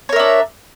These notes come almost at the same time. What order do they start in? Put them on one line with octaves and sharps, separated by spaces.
C#5 A#4 E5 D4